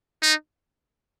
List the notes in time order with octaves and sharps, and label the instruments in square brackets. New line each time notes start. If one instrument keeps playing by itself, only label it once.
[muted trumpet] D#4